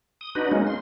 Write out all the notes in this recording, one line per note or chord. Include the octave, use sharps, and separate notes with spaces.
D#6
D4 D#4 F#4 B4
G#3 A#3 C#4 D#4
C6